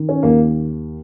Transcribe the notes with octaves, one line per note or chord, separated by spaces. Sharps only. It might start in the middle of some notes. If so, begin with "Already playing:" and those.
Already playing: D#3
C#4
D#2 A#3